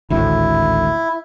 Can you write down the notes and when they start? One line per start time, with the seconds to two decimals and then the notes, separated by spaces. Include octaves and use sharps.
0.10 G#1 D2 A2 E4